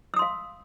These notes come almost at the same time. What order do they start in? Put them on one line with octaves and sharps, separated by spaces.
E6 D#6 C6 F5